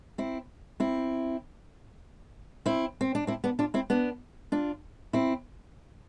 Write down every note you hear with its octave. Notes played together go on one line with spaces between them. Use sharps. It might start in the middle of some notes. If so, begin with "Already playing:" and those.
C4 E4
C4 E4
C4 E4
C4
D4
C4 E4
B3 D4
D4 F4
C4 E4
B3 D4
D4 F4
C4 E4